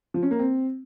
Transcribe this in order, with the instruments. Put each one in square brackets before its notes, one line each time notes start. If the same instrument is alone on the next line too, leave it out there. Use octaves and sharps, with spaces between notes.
[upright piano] F3
C#4
A#3
C4